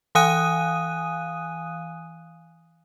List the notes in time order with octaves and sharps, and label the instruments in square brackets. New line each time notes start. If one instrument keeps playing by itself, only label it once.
[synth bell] E3 F5 G#5 D#6 F#6 D#7